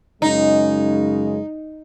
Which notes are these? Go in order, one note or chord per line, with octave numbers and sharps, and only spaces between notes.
F#2 C#3 G#3 D#4